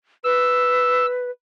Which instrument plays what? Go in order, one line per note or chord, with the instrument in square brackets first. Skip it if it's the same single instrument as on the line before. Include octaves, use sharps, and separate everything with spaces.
[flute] B4 [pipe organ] E6